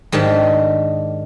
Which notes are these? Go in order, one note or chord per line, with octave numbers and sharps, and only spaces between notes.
G#2 D#3 D4 G4 A5